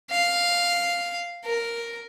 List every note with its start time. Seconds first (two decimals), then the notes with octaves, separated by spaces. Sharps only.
0.11 F5
1.45 A#4